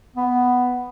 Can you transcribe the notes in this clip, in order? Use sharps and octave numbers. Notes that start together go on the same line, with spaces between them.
B3